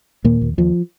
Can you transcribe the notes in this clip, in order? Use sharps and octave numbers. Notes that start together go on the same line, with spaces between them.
D#2 A#2 A#3
D#2
D#2 F3